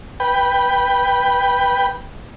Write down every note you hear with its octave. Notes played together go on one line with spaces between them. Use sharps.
B4 G5